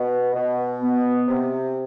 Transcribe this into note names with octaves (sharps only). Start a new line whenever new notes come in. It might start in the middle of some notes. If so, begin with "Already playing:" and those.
Already playing: B2
B2
B3
C3